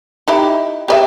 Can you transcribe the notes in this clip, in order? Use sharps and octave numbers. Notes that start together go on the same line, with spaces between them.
D#4 E4 G4
G4 D5 E5